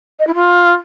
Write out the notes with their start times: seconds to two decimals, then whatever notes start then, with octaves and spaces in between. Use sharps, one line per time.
0.19 D#5
0.27 E4
0.34 F4